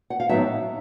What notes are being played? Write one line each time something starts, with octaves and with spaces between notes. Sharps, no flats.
F#5
F5
A2 F#3 B3 D#4 E5